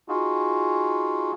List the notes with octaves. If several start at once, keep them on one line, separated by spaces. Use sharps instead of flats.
D#4 F4 F#4 G#4